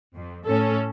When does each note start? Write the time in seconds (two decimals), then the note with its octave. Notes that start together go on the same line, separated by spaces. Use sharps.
0.14 F2
0.46 A2 C#4 A4